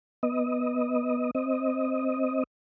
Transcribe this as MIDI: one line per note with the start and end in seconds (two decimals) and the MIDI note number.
0.23 1.31 59
0.23 1.31 75
1.35 2.43 60
1.35 2.43 75